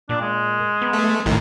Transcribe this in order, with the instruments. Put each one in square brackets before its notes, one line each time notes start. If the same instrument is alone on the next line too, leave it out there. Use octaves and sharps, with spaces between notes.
[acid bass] A#2 [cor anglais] D4
[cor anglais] G#3
[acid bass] B3
[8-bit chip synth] A3
[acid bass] A#1 [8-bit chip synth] D#2 A2 D#3